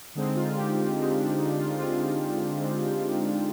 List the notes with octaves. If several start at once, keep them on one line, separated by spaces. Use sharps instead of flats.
D3 G#3 C4 D#4
F4
G4
D3 G#3 C4 D#4
D4
D#4
F4
D3 G#3 C4 F4
D3 G#3 C4